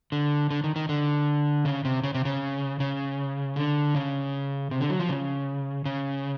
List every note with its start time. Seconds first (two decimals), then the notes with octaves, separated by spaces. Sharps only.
0.12 D3
0.51 D3
0.64 D#3
0.76 D#3
0.89 D3
1.65 C#3
1.85 C3
2.03 C#3
2.14 C3
2.25 C#3
2.80 C#3
3.56 D3
3.95 C#3
4.71 C3
4.80 D3
4.90 F#3
5.00 F3
5.09 C#3
5.85 C#3